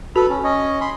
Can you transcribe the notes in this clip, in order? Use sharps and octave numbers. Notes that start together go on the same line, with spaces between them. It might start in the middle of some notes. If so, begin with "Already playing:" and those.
F#4 A4 B4 B5
C#4
C#4 C#5 D#5
B5 C6